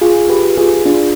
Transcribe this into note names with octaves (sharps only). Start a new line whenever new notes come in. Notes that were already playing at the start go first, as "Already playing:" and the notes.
F4 G#4
G4 B4
F4 G#4
D4 F4